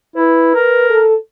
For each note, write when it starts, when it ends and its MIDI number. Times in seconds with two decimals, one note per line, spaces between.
0.16 0.50 64
0.16 0.88 71
0.55 1.03 70
0.89 1.15 69